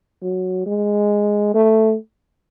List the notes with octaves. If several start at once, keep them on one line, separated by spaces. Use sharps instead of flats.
F#3
G#3
A3